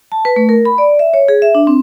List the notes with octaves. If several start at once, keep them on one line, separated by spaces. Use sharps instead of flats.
A5
B4
A3
A#4
B5
D5
E5
C#5
G#4
E5
D4
C4